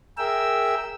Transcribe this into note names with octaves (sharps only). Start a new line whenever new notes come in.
G#4 A#4 E5 G5 E6